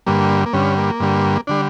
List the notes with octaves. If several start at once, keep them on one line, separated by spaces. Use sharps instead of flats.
G2 D3 G3 A#3
A#3
G2 D3 G3 C#4
A#3
G2 D3 G3
D3 G3 D4